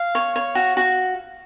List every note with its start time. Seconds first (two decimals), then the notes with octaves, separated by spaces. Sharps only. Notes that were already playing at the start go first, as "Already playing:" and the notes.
Already playing: F5
0.15 C#5
0.36 C#5
0.55 F#4
0.77 F#4